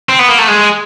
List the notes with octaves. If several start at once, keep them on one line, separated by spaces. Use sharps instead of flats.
C4
B3
A#3
A3
G#3